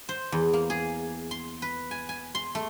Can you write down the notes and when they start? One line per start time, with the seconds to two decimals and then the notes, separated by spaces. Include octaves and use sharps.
0.09 C5
0.32 E2
0.53 A#3
0.70 G#4
1.31 C6
1.62 B4
1.91 G#5
2.09 G#5
2.35 C6
2.55 A3